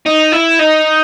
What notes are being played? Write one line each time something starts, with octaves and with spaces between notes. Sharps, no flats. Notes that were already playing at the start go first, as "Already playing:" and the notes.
D#4
E4
D#4